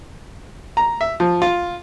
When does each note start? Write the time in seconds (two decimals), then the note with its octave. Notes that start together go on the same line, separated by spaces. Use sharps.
0.77 A#5
1.01 E5
1.20 F3
1.42 F4